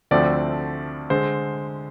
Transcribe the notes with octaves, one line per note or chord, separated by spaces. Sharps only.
D2 D3 F3 A3 C4 D5
D3 G#3 C5